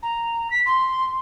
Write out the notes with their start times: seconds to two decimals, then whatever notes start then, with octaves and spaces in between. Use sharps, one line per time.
0.02 A#5
0.50 B6
0.66 C6